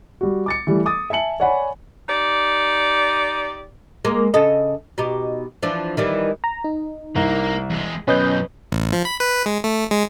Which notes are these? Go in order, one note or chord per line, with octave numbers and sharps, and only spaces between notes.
G3 F#4
D6 A6 C#7
E3 G3 A3 A4
D6 D#6 A6
E5 G#5 A5 C#7 F#7
C#5 D5 F#5 G#5 B5
D#4 G4 D5
G#3 A#3
C#3 A4 D#5
B2 D#4 G4
E3 F3 D4
D#3 E3 G3
A#5
D#4
C2 A#3
E2 G#3
F#2 B2 C#4 B4 D#5 G6
A1
F3
B5
B4
G#3
A3
G#3